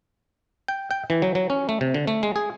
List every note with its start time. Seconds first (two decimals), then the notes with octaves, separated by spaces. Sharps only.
0.68 G5
0.91 G5
1.10 E3
1.22 F#3
1.35 F#3
1.50 C#4
1.69 A3
1.81 C3
1.94 D3
2.07 A3
2.23 G#3
2.36 G#4